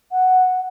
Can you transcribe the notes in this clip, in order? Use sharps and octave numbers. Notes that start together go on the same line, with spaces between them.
F#5